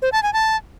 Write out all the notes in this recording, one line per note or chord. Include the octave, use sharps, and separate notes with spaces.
C5
A5
G#5
A5